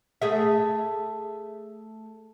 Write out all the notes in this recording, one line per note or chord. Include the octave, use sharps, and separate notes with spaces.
A3 G#4 E5